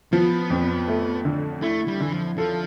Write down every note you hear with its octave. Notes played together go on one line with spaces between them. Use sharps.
F3 B3
F2
A3
D3
A3 E4
G3
D3 E3
F3
F3 A4